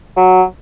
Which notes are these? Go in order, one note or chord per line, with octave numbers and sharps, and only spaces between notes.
F#3